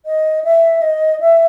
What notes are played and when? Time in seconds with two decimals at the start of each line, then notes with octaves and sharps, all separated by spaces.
0.06 D#5
0.44 E5
0.82 D#5
1.21 E5